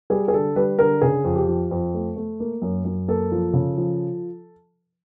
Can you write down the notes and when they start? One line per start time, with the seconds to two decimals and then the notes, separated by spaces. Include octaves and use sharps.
0.10 G3 G#4
0.28 G#4
0.33 D3 A4
0.56 G3 B4
0.79 D3 A#4
1.01 C#3 G#4
1.24 F2
1.36 G4
1.48 F3
1.71 F2
1.94 A3
2.16 A3
2.40 A#3
2.62 F#2
2.85 F#2
3.08 A#3 A4
3.32 F3
3.53 C#3
3.77 F3